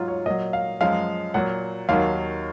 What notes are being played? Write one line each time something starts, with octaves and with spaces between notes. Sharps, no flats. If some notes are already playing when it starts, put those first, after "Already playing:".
Already playing: G#2 F#3 F4
C#5
A#2 F#3 D#5
F5
F#2 F3 G#3 F5
A#2 F#3 F#5
D#2 D#3 F#3 F5